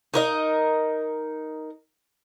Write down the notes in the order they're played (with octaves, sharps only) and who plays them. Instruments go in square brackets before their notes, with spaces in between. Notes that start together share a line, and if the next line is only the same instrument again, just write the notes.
[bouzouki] D#4 A#4 D#5